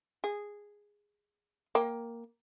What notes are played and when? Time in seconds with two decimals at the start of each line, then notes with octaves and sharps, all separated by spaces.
0.24 G#4
1.75 A#3 G5